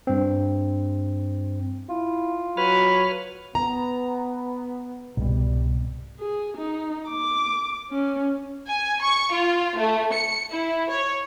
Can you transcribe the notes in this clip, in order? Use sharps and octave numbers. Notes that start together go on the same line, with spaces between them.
G2 C4
E4 F4
F#3 B4 C#5 B5 F6
B3 A#5
C2 G#2 B2 G3
G#4
D#4
D6
C#4
G#5
C#6
F4
A3
C#7
E4
C#5